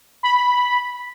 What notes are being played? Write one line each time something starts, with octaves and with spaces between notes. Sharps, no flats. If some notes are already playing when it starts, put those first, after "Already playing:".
B5